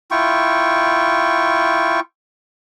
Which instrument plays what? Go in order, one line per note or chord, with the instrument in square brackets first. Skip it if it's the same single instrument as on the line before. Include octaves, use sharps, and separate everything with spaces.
[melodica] E4 F4 G5 C#6